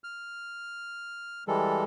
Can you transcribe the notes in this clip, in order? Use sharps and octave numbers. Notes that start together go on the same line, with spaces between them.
F6
E3 G3 G#3 A4